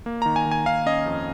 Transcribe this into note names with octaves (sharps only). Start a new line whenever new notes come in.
A#3
A#5
D#3
G#5
D#3
G#5
D#3 F5
C#4 D#5
F2